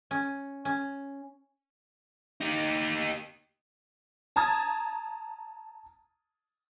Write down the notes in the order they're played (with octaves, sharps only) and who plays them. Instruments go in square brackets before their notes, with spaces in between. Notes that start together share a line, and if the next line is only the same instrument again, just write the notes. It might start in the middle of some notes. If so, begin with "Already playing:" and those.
[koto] C#4
C#4
[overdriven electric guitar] D#4 G4
[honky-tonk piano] A5 A#5 D#6 G#6 A6